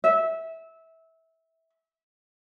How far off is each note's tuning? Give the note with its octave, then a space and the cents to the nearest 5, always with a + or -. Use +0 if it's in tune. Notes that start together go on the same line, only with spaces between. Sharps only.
E5 -20